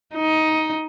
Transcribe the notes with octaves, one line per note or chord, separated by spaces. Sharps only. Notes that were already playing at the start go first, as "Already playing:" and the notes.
D#4